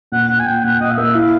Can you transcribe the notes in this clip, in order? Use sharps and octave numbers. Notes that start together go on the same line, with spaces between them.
A#2 F#5
A#2 F#5
G#5
A#2 G5
A#2 F#5
A#2 D#5
F5
A#3 E5
E4 F5